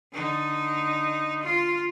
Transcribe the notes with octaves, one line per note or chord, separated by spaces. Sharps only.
D3 D#4
F4